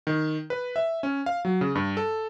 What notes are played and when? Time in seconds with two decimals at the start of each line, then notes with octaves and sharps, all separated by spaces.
0.07 D#3
0.50 B4
0.76 E5
1.03 C#4
1.26 F5
1.45 F#3
1.61 C#3
1.75 G2
1.97 A4